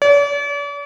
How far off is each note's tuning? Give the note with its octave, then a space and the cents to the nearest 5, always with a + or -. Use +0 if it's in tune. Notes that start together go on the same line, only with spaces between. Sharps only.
D5 -45